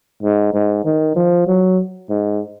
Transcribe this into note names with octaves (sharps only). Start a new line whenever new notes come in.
G#2
G#2
D#3
F3
F#3
G#2